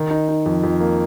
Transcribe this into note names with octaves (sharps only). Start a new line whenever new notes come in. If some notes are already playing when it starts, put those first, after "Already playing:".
Already playing: D#3
D#4
D#4
F2
F2
A#3